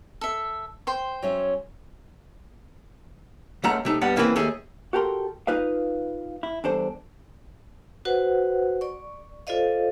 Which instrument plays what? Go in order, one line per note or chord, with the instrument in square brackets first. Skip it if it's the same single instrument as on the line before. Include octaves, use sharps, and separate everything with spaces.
[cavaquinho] A4 E5
C5 G5 C6
[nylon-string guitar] F#3 C#4 E5
[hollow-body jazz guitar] C#2 C#3 A3 F#5 A#5
C3 A3 D#4
G2 G3 B3 F#5
C#3 E3 A#3 C4 F#4 B4
D#2 A3 G#4
F#4 G4 A4 A#4 C6
D#4 F4 B4 D#5 F5
E4
E2 G2 D4 A4 C5
[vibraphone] F#4 B4 C5 F#5
D5 C#6
F4 A4 C5 D5 D#5 F5